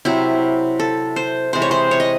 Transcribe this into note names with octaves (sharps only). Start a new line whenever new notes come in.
C3 F#3 C4 E4
A4
C5
C3 E3 G#3 C5
C#5
C5
C#5
D#5